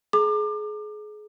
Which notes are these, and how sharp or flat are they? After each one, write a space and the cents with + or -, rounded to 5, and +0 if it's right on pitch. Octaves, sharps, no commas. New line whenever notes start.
G#4 +30 A#5 -20 D6 +30